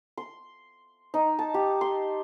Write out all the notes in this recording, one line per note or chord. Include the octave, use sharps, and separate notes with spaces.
C6
D#4
A5
G4
C6